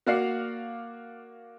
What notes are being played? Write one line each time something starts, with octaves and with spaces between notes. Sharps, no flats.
A#3 F#4 D5 F5 F#5 C7